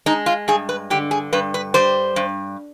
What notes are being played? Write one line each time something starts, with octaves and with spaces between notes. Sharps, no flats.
G#3 D#4
F4
G2 G#4
B4
D3 G4
G#4
G2 B4
B4
G3 C5
G2